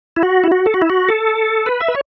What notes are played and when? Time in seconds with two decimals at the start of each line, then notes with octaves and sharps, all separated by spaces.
0.16 E4
0.23 F#4
0.44 E4
0.52 F#4
0.66 A4
0.74 F#4
0.82 E4
0.90 F#4
1.09 A4
1.66 B4
1.81 E5
1.88 B4
1.95 C#5